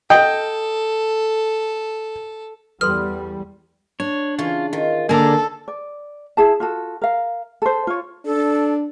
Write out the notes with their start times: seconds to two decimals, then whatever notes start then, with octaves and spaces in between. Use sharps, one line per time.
0.10 A4 D#5 G5
2.81 E2 G3 A4 B4 C6 F6
4.00 D4 C#5
4.39 C#3 E3 F4 C#5
4.73 D#3 F4
5.09 D3 A#3 G#4 A4 D5 A#5
5.68 D5
6.37 E4 G#4 A5
6.60 F4 F#4 A4
7.01 A#4 F5
7.62 A4 C5
7.87 F4 C#5
8.25 D4 A4